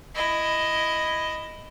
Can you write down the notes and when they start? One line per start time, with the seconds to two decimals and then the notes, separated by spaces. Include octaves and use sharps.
0.15 E4 D#5